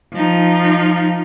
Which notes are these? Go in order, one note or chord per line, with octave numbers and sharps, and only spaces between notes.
F3 D#4